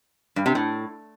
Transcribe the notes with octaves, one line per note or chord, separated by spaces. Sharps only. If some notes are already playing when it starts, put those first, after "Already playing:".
G2
C3
A2